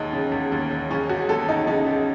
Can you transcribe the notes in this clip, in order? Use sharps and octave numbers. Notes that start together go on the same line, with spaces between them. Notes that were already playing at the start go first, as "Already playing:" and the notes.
Already playing: E1 D#2 D#4
C#3
E1
D#2
E1
C#3 C#4
E1 F#4
D#2 A4
E1 D#4
C#3 D#4
E1